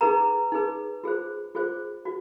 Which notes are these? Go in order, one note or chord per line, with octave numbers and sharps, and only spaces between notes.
D#4 G#4 B4 A#5
D#4 G#4 B4
F4 G#4 C5
F4 G#4 C5
F#4